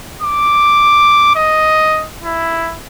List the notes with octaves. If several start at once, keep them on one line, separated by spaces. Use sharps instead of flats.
D6
D#5
E4